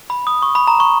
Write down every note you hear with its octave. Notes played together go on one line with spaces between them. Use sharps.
B5
D#6
C#6
B5
A#5
C#6